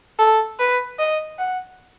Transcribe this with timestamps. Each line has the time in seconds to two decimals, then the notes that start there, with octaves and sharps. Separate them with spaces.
0.19 A4
0.59 B4
0.99 D#5
1.39 F#5